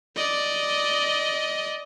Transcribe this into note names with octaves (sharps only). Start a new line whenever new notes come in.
D5 D#5